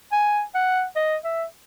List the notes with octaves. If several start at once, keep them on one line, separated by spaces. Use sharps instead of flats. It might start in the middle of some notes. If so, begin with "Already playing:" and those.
G#5
F#5
D#5
E5